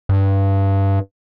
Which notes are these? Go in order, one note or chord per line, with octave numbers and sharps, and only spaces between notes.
G2